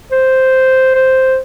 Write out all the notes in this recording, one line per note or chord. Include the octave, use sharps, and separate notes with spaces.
C5
C5